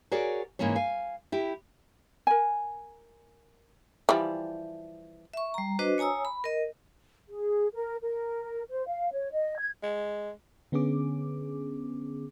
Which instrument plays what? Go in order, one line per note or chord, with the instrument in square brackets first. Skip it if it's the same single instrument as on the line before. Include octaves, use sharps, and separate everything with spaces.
[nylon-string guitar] F#4 G#4 A#4 C#5 D5
G#2 C#3 E3 A#3 C#4 C#5
F5 G#5
E4 G4
[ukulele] A#4 G#5
[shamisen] E3 F3 G3
[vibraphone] E5 C#6
G3 A#5
D4 F#4 B4 C5 D#5
C#5 G#5 A#5 D#6 E6
B5
A#4 D#5
[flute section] G#4
A#4
A#4
C5
F5
C#5
D#5
G#6
[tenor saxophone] G#3
[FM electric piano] D3 B3 C#4 G#4 D6